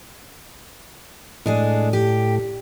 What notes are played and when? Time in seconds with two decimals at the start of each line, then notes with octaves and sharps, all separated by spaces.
1.46 A2 G#3 D4 G#4
1.93 G4